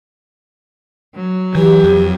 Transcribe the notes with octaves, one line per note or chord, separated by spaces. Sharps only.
F#3
E3 G4
F2